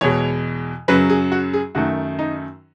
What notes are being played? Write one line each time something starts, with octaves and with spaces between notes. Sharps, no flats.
E2 B2 G#3 C#5
F#2 C#3 F#3 B4
G#4
F#4
G#4
F#2 D#3 A3 F#4
D#4